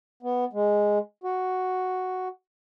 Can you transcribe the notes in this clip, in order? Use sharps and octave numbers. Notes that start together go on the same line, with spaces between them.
B3
G#3
F#4